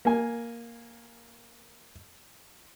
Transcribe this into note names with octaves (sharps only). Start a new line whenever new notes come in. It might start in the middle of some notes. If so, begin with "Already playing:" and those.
A#3 G#5